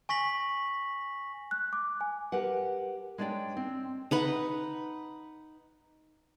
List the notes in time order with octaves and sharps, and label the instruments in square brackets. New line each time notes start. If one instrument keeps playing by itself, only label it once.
[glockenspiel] G#5 C#6 A#6 B6 F#7
[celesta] F#6
D6
G#5
[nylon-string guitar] G4 A#4 B4 F#5
G#3 D4 C#5 D5 G5
C4
[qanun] D#4 B4 F#5